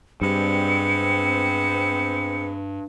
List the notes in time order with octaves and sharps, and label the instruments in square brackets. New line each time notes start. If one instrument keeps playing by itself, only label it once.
[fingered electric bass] G2 [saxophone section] G#3 B3 C4 [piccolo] C#7